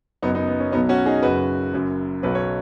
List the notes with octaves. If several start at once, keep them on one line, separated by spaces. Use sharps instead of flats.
F#1 F#2 F#3 B3 D#4
B3 D#4
B3
C#4
B1 B2 F#3 B3 D#4
C#4 F#4
D#4 G#4
F#1 F#2 C#3 F#4 B4
F#1 F#2 F#3
B1 B2 F#3 B4
C#5